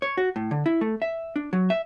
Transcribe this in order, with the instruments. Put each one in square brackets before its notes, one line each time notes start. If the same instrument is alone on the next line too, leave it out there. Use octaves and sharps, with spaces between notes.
[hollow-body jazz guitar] C#5
F#4
A2
D3
E4
A3
E5
D4
F#3
E5